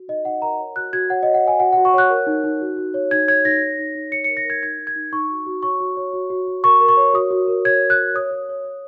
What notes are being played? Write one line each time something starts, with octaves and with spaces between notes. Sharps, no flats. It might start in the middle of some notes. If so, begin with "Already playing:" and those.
Already playing: F#4
D#4 D#5
D#4 F#5
A#4 A#5
C#5
F#4 F#6
F#4 G#6
C#5 F#5
D#5
C#5
F#5
C#5 G#5
F#4 F#5
F#5
F#4
C#6
C#5 F#6
A#4
D#4
D#4
F#4
F#4
C#5
D#4 G#6
C#5 G#6
D#4 A#6
D#4
D#4
D#4
C#5 C#7
C#7
A#4
A#6
A#4 G#6
D#4 G#6
D#4
G#6
D#4
D#4 C#6
F#4
F#4
C#5 C#6
F#4
C#5
F#4
F#4
F#4
A#4 C#6
A#4
C#6
C#5
F#4 D#6
F#4
A#4
C#5 G#6
C#5
F#6
C#5
C#5 D#6
C#5
C#5
C#5